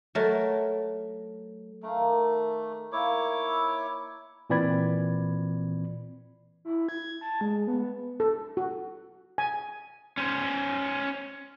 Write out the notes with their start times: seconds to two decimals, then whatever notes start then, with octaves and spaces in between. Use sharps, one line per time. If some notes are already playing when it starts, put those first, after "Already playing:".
0.15 F#3 A3 A#4
1.83 A3 A#4 F5 A#5
1.95 D#3 D5
2.92 A#3 E4 C#5 D6
4.50 A#2 E3 C4 D5 B5 G#6
6.65 E4
6.89 G#6
7.21 A5
7.41 G#3
7.67 B3
8.20 A4
8.57 F#4
9.38 G#5
10.18 C#4 C5